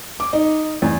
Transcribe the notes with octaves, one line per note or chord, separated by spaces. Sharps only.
D6
D#4
E2